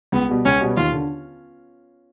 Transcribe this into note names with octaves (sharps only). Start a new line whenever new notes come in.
C#2 B3
B2 G3 B3
C#2 C#4
B2 G3 B3
D#2 F4
D3